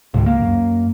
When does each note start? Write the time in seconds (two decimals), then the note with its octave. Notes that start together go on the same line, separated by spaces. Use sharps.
0.14 C#2 G#2 D3
0.26 A#3
0.40 F#2 F#3